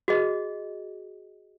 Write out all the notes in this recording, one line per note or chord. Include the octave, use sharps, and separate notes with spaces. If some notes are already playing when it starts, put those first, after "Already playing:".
F#4 G#4 D#5